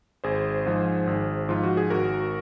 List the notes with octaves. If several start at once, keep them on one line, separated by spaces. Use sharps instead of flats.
G#1 G#4 C5
G#2 F3
G#1
G#2 F3 F4
F#4
G#4
G#1 F#4 A#4